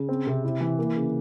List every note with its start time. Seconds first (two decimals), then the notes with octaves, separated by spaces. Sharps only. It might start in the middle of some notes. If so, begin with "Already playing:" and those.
Already playing: C#3
0.09 C4
0.27 C3
0.44 E4
0.61 E3
0.79 A#3
0.96 C#3